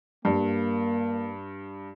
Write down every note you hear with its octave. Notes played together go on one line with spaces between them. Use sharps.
G2 A#3